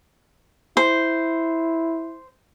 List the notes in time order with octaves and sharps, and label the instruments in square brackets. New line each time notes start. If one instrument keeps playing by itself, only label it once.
[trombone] E4 [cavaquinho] C5